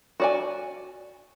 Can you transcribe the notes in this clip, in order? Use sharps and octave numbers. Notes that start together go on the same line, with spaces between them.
F#4 D5 G#5